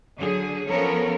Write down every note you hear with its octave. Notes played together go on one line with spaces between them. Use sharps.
D3 F#3 G#4
F3 B3 C#4 A4 A#4 C#5